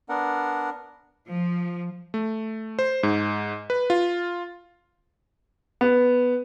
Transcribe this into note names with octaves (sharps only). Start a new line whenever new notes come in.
B3 D4 A#4 F#5
F3
A3
C5
G#2
B4
F4
B3